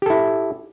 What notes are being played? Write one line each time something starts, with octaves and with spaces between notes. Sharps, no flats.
E4 G4 A4